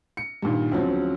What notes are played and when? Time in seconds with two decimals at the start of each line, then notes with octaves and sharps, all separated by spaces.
0.17 C#7
0.43 G2 A#2 D#3
0.72 D2 C#3 F3 F#3 C4